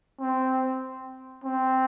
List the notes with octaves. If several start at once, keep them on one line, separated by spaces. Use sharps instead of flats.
C4
C4